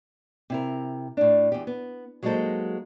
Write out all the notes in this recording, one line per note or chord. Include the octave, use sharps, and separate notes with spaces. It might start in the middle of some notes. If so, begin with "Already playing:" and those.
C3 E4 A#4
A2 D4
E2 G4
B3
F#3 G#3 A#3 D#4 A4 C5